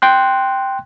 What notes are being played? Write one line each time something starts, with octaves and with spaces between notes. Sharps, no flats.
G5 C6 F#6